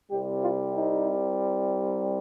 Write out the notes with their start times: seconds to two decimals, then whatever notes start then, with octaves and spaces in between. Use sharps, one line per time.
0.11 C2 C3 G3 G4
0.42 F4
0.75 D#4